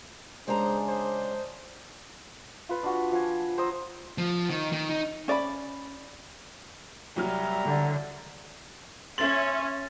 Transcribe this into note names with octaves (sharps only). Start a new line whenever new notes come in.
C#3 G#3 D4 G#4 C5 A#5
C5
F4 B4
D4 F#4
F3 G#5
C5 A#5 D#6 E6
F3
D#3
D#3
D#4
C#4 D5 D#5 B5
C2 F#3 G3 E5 A#5 F6
D3
C#4 E5 C6 A6 F#7